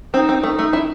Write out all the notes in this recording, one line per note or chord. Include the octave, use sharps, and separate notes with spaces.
C4 D#4
C4
A3 D#4
A3
E4